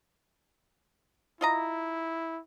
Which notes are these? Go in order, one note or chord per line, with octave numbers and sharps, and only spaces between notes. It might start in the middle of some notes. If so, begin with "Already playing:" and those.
E4 F4 D#5 A#5